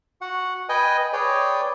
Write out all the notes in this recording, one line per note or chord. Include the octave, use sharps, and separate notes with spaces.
F#4 F#5
B4 D#5 G5 G#5
G#4 B4 C#5 D5 G5